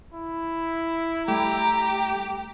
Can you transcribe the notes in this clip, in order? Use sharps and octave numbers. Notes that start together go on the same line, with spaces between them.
E4
G3 A3 G4 A#5